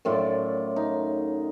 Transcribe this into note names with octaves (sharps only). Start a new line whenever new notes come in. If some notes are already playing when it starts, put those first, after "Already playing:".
F#2 A2 F4 D5
D#4